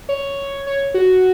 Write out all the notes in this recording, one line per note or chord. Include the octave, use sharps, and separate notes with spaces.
C#5
C#5
F#4